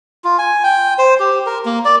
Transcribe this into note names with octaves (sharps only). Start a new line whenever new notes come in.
F4
G#5
G5
C5
G4
A#4
A#3
D5